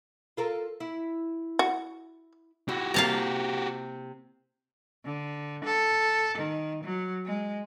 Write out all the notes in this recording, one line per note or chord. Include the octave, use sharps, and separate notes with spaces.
F4 A4 A#4
E4
F#4
E4 F#4 G4
C3 A#3 F5 A5 A#5
D3
A4
D#3
F#3
G#3